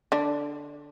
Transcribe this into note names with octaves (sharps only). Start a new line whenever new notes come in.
D3 D4